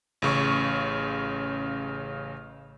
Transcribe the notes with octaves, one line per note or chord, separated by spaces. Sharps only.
A1 C#3 C#6